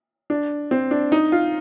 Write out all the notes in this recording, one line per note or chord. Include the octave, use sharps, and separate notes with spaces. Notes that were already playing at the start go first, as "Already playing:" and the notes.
D4
C4
D4
D#4
F4